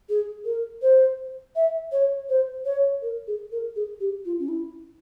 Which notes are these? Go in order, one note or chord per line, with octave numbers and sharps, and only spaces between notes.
G#4
A#4
C5
E5
C#5
C5
C#5
A#4
G#4
A#4
G#4
G4
F4
C#4
E4